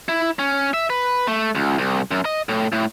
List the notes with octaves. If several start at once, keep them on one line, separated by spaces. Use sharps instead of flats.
E4
C#4
E5
B4
A3
C#2
C2
F#2
D#5
A2
A2